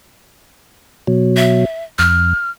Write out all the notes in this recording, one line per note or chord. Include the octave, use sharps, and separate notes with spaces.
B2 F#3
E5
F2 F6